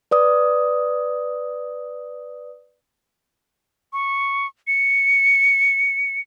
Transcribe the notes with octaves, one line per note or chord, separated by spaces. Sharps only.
B4 D5 D#6
C#6
C#7